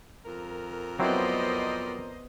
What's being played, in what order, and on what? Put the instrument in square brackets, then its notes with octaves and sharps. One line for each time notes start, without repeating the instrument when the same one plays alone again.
[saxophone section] F2 A#4
[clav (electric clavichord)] F#3 C4 E4 [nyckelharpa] B3 D5 [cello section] C5 D#5